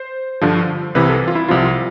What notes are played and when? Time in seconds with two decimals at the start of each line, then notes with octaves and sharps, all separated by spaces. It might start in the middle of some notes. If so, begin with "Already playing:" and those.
Already playing: C5
0.41 G2 D3 F3
0.95 C2 C3 E3 B4
1.09 A4
1.28 F4
1.35 E4
1.48 C2 C3 F3 F4